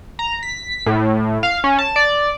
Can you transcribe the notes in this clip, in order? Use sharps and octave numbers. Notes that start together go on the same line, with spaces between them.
A#5
B6
A2
F5
C#4
A5
D5